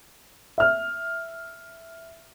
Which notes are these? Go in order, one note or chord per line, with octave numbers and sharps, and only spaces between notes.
E5 F6